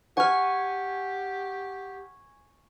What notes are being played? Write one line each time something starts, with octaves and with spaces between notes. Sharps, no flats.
G4 F#5 G#5 C#6 F6